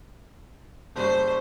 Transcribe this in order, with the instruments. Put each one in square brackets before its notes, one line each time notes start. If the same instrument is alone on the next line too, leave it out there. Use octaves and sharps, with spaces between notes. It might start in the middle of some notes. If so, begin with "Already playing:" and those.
[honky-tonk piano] F#1 G3 C#6 [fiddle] C5